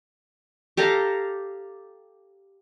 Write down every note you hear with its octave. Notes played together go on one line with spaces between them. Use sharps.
G4 A4 F5 A#5